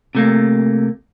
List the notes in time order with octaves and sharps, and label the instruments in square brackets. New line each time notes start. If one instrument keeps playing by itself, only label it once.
[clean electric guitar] C3 A3 A#3